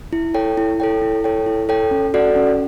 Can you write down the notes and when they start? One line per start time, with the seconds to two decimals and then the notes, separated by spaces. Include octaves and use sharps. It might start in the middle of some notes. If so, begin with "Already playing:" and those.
0.13 E4
0.34 A4 C#5 G5
0.57 E4
0.80 A4 C#5 G5
1.02 E4
1.24 A4 C#5 G5
1.46 E4
1.69 A4 C#5 G5
1.91 C#4
2.14 F#4 A4 D5 F#5
2.36 C#4